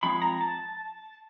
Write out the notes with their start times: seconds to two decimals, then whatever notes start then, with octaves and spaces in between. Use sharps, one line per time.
0.03 F3 G#3 C4 B5
0.22 A#5
0.41 A5